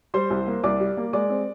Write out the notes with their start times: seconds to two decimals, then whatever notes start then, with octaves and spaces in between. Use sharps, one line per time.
0.14 G3 C5 C6
0.30 C2
0.47 A#3
0.63 C2 D5 D6
0.80 G3
0.97 A#3
1.13 G#3 D5 D6
1.30 C4